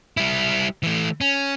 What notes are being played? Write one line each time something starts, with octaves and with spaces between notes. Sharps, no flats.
G3 E4
E3 A3
C#4